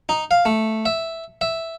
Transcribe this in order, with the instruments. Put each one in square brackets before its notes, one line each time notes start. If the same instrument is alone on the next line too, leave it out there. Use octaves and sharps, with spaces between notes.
[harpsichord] D#4
F5
A3
E5
E5